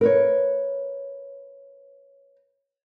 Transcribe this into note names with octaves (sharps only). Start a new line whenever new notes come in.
A#4 B4 C#5